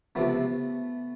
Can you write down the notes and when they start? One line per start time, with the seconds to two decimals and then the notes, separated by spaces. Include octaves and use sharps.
0.15 C#2 C3 F3 A3 B3